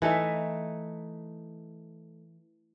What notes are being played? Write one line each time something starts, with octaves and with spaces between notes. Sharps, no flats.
E3 A3 D#4 E5